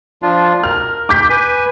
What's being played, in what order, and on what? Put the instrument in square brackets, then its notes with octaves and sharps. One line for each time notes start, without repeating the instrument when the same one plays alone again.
[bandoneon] F3 D4 F4
[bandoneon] A#4 [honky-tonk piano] F6
[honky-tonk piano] D6 G6 B6
[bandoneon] B4 G#5